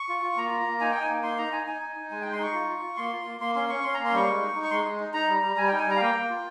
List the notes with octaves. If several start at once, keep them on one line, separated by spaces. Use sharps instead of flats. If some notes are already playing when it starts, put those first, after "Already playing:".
Already playing: C#6
F4
F4
A#3 A#5
F4
A#3
D#4 G#5
D#4 G5
G#5
A#3
D#4 C6
D#4 A#5
D#4 G#5
D#4 G#5
D#4
D#4
G#3 G#5
D#4 G5
C6
D#4 C#6
F4
F4
F4
A#3 C6
F4
A#3
A#3 C6
C#4 C6
C#4 C#6
C#4 C6
A#3 A#5
C6
G3 C#6
G#3
D#4
D#4
C#6
G#3 C6
G#3
D#4
D#4 A#5
G3
G3
G3 G#5
D#4 G5
G#5
G3 A#5
F5
A#3 G5
A#3
F4